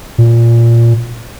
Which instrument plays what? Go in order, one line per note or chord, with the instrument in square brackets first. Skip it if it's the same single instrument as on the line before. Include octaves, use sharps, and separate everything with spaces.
[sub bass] A#2